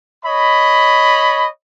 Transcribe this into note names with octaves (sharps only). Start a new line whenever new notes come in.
C#5 D#5 B5